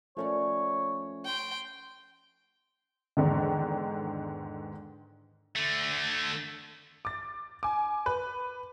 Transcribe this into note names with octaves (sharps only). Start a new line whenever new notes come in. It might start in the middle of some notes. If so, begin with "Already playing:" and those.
D#2 F3 A3 C#4 A#4 C#5 D5
G5 C6
E2 G#2 D3 D#3
D3 A3
D6 A6
G#5 D6
B4